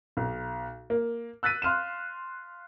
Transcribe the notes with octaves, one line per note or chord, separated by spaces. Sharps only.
B1
A#3
E6 F#6 A6 B6 D#7
F5 C6 F6 D#7 E7